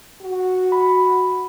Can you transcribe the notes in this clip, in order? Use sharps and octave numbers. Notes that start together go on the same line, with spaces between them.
F#4
B5